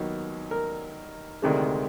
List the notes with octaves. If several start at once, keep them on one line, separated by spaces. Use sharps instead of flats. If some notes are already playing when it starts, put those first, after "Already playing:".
Already playing: D#2 D#3 F#3 B3
A#4
D2 C3 D#3 G#3